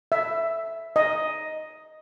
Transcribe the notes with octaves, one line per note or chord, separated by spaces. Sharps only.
E5
D#5